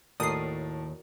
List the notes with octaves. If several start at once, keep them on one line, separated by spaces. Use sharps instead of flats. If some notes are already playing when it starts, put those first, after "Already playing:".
D#2 A2 F#4 A#4 D5 D#6 C7